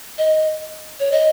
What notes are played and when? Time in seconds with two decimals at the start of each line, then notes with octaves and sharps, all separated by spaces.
0.18 D#5
1.00 C#5
1.12 D#5